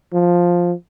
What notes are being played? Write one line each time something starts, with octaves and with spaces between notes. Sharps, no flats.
F3